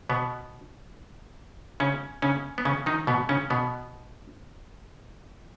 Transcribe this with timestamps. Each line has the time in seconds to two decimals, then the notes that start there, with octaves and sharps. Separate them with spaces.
0.10 B2 B3
1.80 C#3 C#4
2.22 C#3 C#4
2.58 B3
2.65 C#3 C#4
2.86 D#3 D#4
3.07 B2 B3
3.29 C#3 C#4
3.50 B2 B3